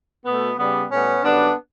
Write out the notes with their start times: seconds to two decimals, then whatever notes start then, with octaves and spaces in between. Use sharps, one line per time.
0.25 B2 A3 B3
0.58 C#3 G3 B3
0.90 A2 G3 B3 C#4
1.23 F#2 D3 G3 B3 D4